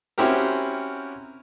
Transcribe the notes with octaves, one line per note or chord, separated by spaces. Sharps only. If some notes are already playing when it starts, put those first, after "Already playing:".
C4 C#4 E4 F#4 G4 A#4